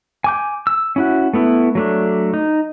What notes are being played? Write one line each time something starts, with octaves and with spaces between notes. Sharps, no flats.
G#5 D6 G6
E6
C#4 E4 F#4
A3 B3 E4
F#3 A3 D4
D#4